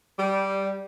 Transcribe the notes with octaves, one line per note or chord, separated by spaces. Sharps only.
G3